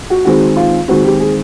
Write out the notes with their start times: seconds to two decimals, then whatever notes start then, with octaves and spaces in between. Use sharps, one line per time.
0.10 F#4
0.25 D#3 G#3 C4 F#4
0.57 F4
0.88 D#3 G#3 C4 F#4
1.04 G4
1.20 G#4